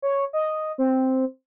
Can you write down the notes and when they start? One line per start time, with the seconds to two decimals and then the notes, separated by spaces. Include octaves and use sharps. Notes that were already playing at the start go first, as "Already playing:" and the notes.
0.02 C#5
0.33 D#5
0.78 C4